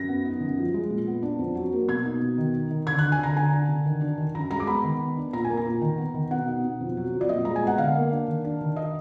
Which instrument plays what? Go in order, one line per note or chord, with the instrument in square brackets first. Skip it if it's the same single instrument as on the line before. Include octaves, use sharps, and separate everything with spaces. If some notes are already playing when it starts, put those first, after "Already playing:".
Already playing: [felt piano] F#2 A#6
B3
D#4
F#2
F3
G#3
A#2
B3
D4
F2
F#3
A#3
B2 G#6
D#4
B2
D#3
D#4
D#3
D3 G#6
D4 F#6
G#5
D3 A#5
D3 G#5
D4
D3
D#3
D4
D#3
F#2 A#5
G#3 A#5
D6
B3 B5
D#3
B3
D4
A#2 A#5
A#3 G#5
A#5
A#2
D#3
B3
D#3
B2 F#5
D#4
B2
F2
F#3
F2
D5
A#2 D#5
G#3 A#5
G#5
B3 F#5
D3 F5
A#3
D4
D#3
D4
D#3
D#5